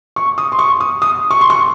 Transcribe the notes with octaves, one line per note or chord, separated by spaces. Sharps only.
C#6
D#6
C6
C#6
D#6
D#6
C#6
C6
C#6